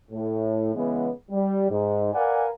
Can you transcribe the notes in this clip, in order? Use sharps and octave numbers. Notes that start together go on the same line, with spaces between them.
A2
C#3 E3 G#3 B3
G3
G#2
A#4 B4 D5 F5 F#5 G#5